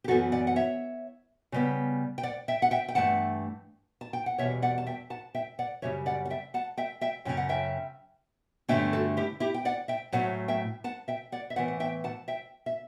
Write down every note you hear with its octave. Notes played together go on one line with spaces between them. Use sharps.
G4
F#2 E3 B3 F#4 A4
D5 F#5
F#5
C#5 E5
C#3 G3 B3
G5
D5 F#5
E5 G5
F#5
E5 G5
G5
G2 E3 A3 F#5 A5
A5
G5
F#5
E2 B2 G3 C#5 E5
D5 F#5
A5
E5 G5
F#5 A5
E5 G5
D5 F#5
F#2 C#3 G3 C#4 C#5 E5
D5 F#5
F#5
E5 G5
F#5 A5
E5 G5
E5 G5
F#2 C#3 F#3 C#4 G5
F#5
E5 G5
G2 D3 A3 C#4 E5 G5
F#4 A4
E4 G4
E4 G4
G5
D5 F#5
E5 G5
A2 F#3 A3 C#4 F#5 A5
E5 G5
F#5 A5
E5 G5
D5 F#5
E5
A2 E3 B3 D5 F#5
F#5
E5 G5
F#5 A5
E5 G5
E5